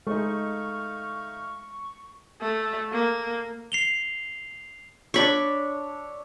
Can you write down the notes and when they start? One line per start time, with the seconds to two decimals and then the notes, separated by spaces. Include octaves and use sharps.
0.07 G#3 A3 D#4 F5 C#6
2.41 A3
2.92 A#3
3.72 C7 F7 G7
5.14 D4 C#5 D5 E5 B5 C#6